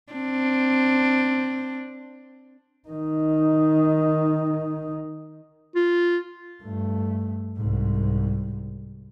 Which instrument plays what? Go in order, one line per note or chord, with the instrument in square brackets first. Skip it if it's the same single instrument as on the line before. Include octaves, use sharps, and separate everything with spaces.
[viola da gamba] C4 D4
[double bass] D#3 D#4
[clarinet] F4
[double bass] G2 A3
C2 G#2